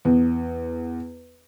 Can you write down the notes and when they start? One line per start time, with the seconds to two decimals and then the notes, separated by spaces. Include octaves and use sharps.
0.05 E2